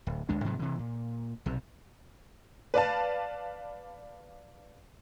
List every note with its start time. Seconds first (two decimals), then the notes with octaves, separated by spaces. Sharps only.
0.07 D1
0.29 D2 G#3 D4
0.44 G#2 C3 D#3 F#3
0.59 C3 E3
0.79 A#2
1.46 B1 C3
2.74 B4 D5 F5 A5